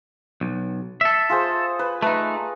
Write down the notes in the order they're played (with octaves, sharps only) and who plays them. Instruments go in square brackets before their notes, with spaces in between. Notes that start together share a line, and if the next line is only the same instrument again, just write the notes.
[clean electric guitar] B1
A4 E5
[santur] F4 G#4 C5
B4
[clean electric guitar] A3 D#4 [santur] B4